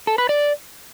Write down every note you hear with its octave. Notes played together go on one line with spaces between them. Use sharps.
A4
B4
D5